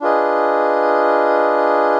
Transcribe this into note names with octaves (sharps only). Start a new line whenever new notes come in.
D4 F4 G#4 B4 D#5